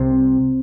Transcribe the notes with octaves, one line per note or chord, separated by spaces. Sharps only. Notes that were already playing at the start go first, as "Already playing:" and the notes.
Already playing: C2 C3 C4